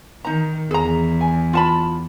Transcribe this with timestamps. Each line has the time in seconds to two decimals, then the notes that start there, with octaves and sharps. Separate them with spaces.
0.25 D#3 D#4 A#5
0.71 E2 G#4 A#5
1.21 G#5
1.53 F4 A5 B5